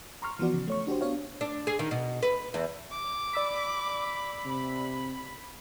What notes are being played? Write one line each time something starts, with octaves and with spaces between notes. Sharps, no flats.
A#5 C6 C#6 F6
E3 F3 B3 F#4 D5
C#3
A3 C#5 C#6
D4 F#4 G4 C5
B3 D4 C#5 F5
D4
G#4
D#3
B2
B4
E2
D6
D5 B5 E6 B6
C3